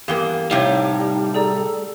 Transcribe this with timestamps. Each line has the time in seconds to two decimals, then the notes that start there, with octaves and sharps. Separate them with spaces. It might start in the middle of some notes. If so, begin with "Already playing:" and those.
0.08 E2 G2 A#3 G4 F5 G7
0.51 A2 C3 G3 D#4 C#5 F5
1.34 G#4 A4 D5 A#5